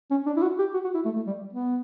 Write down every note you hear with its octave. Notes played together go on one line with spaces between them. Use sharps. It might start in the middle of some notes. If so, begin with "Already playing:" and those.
C#4
D4
E4
F#4
G4
F#4
F#4
E4
A3
A3
G3
B3